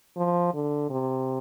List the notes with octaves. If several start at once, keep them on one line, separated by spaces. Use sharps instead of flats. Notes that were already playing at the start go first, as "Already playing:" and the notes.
F3
D3
C3